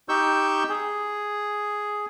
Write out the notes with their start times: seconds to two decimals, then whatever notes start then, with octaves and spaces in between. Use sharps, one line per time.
0.09 D#4 G4 C#6 E6 G6
0.69 G#4